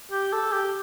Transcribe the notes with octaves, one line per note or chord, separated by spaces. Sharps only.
G4
A4
G4